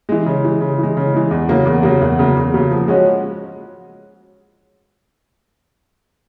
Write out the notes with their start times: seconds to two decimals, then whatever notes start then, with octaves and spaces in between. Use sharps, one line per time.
0.09 E3 G#3
0.26 C#3
0.44 E3 G#3
0.61 C#3
0.78 E3 G#3
0.97 C#3
1.14 E3 G#3
1.31 E2
1.49 C#3 F#3 A#3
1.65 E2
1.83 C#3 F#3 A#3
2.02 E2
2.19 C#3 F#3 A#3
2.36 E2
2.54 C#3 F#3 A#3
2.71 F3
2.88 G#3 C#4 F#4